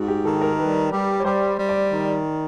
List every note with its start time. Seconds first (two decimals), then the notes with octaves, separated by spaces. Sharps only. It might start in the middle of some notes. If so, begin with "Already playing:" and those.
Already playing: G#2 F#4
0.08 G4
0.24 D#3 A4
0.42 A#4
0.58 G3 B4
0.91 G3
1.20 C#5
1.25 G3 C5
1.58 G3
1.69 D5
1.91 D#3